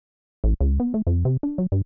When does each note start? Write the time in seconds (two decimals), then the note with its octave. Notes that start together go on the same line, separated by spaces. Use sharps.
0.44 A1
0.60 C#2
0.80 B3
0.94 A3
1.07 F2
1.25 C3
1.43 D4
1.58 F#3
1.72 G2